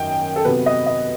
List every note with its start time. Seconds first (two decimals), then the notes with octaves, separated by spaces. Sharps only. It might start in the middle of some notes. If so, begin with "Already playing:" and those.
Already playing: F#2 D#3 G5
0.36 A4
0.45 C3 F#3 B3 B4
0.66 D#5
0.87 D#5